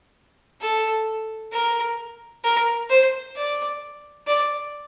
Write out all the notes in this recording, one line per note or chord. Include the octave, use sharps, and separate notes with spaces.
A4
A#4
A#4
C5
D5
D5